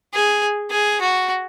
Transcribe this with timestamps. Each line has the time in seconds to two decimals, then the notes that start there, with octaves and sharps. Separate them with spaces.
0.14 G#4
0.71 G#4
1.00 F#4